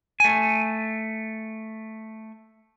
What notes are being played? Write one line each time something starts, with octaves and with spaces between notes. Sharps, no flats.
A3 G#5